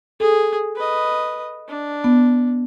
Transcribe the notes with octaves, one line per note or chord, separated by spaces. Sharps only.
G#4 A4
B4 D#5
D4
B3